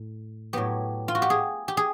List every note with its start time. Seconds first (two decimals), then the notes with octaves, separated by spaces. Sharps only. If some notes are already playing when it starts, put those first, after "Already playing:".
Already playing: A2
0.53 A2 F#3 B3 G4
1.08 F4
1.15 F#4
1.22 G4
1.30 G#4
1.68 G4
1.77 G#4